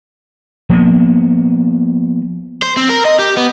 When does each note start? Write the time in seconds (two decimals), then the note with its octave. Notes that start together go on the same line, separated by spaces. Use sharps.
0.70 F3 A#3 B3
2.62 C5
2.77 C4
2.89 A#4
3.05 D#5
3.19 G4
3.37 B3